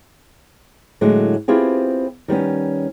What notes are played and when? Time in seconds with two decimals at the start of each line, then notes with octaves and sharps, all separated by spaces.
1.01 A2 D3 F#3 G#3
1.48 B3 C4 E4 F4 G4 G#4
2.28 D#3 G3 B3 C#4